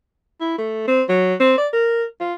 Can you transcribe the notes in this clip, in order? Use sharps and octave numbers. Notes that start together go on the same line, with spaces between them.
E4
A3
C4
F#3
C4
D5
A#4
F4